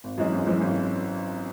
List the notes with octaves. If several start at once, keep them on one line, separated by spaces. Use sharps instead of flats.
G#1
F#2 E3 G#3 C#4
G#1
F#2 E3 G#3 C#4
G#1